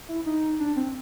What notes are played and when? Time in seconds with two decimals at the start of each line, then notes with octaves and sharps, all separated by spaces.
0.09 E4
0.26 D#4
0.60 D4
0.76 C4